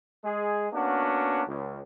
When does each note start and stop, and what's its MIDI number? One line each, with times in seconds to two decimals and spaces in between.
0.24 0.67 56
0.24 0.67 68
0.73 1.42 58
0.73 1.42 59
0.73 1.42 61
0.73 1.42 62
0.73 1.42 66
1.47 1.79 37